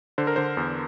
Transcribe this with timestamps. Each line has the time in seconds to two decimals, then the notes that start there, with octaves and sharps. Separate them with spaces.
0.18 D3 C5
0.27 A#4
0.36 D3 C5
0.57 E2